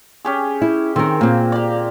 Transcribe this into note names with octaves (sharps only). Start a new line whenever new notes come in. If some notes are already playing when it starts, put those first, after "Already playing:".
C#4 G4 G#4
E4
D#3 C4 A#4
A#2 A#3 C4
G4 D5